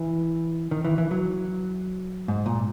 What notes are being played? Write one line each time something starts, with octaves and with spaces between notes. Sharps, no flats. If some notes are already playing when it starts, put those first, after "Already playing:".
Already playing: E3
D#3
E3
E3
F#3
G#2
A#2